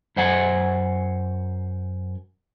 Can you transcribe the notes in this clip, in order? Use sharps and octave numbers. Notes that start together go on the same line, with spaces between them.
F#2 C5 F#5 G#5